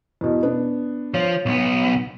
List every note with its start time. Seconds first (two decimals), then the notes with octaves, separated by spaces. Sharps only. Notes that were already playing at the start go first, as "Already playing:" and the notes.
0.21 E2 B2
0.43 B3 D4
1.14 F3 C#5
1.46 B1 B3